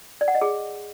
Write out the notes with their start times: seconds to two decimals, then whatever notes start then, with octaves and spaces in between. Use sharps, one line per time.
0.21 D5
0.28 F#5
0.35 D#5
0.41 G#4